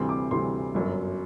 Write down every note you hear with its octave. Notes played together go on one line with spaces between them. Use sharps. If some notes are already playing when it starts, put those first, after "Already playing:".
Already playing: D2 C3 E3 G3 C6
D6
D2 C3 E3 G3 C6
G1 F#2 F#3